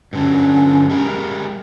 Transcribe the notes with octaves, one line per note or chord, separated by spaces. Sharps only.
G2 D3 F#3 C#4
G3 G#3 A#4